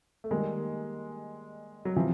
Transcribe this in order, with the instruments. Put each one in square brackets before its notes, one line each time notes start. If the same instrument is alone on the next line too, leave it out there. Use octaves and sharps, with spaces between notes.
[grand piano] A3
[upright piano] D#3 G3 A#3 [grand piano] G#3
[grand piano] F#3
[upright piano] C3 E3 [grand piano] F3